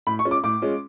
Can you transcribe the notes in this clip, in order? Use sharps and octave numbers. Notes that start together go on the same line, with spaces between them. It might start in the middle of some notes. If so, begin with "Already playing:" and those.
A2 B5
C#6
G#3 C#4 F4
D6
A2 D6
G#3 C#4 F4